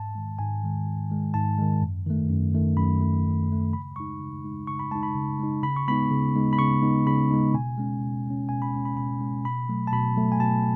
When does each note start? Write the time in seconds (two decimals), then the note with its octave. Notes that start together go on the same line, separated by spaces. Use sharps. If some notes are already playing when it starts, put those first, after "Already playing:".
Already playing: G#2 A5
0.15 D#3 G#3
0.39 G#2 G#5
0.63 D#3 G#3
0.86 G#2
1.10 D#3 G#3
1.34 G#2 A5
1.58 D#3 G#3
1.82 F#2
2.06 D#3 A3
2.29 F#2
2.54 D#3 A3
2.77 F#2 B5
3.01 D#3 A3
3.25 F#2
3.49 D#3 A3
3.73 C#3 B5
3.96 G#3 D#4 C#6
4.20 C#3
4.44 G#3 D#4
4.67 C#3 C#6
4.79 B5
4.91 G#3 D#4 A5
5.03 B5
5.15 C#3
5.39 G#3 D#4
5.63 C#3 B5
5.76 C#6
5.88 G#3 B3 D#4 B5
6.11 C#3
6.35 G#3 B3 D#4
6.53 B5
6.59 C#3 C#6
6.82 G#3 B3 D#4
7.06 C#3 B5
7.31 G#3 B3 D#4
7.54 B2 G#5
7.78 G#3 C#4
8.01 B2
8.26 G#3 C#4
8.49 B2 G#5
8.62 B5
8.73 G#3 C#4
8.85 B5
8.97 B2 B5
9.21 G#3 C#4
9.44 B2 B5
9.69 F#3 A3
9.87 A5
9.92 B2 B5
10.16 F#3 A3
10.32 G#5
10.40 B2 A5